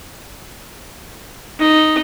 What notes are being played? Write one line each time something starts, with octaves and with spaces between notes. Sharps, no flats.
D#4